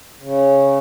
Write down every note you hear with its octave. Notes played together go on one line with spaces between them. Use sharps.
C#3